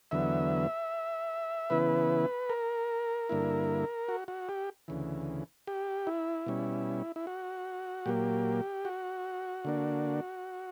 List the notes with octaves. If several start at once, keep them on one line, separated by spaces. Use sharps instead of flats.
E2 D3 F#3 B3 E5
C#3 E3 B3 E4 B4
A#4
G2 D3 A#3 E4
F#4
F#4
G4
D2 C#3 E3
G4
E4
B2 G3 C#4
E4
F#4
A#2 F#3 A#3 G4
F#4
D3 A#3 D4